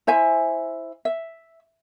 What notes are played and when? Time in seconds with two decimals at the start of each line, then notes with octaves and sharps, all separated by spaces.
0.07 E4 C5 E5 G#5
1.05 E5